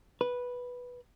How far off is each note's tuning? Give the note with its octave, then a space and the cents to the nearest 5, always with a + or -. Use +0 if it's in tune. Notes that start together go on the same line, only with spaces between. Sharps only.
B4 -5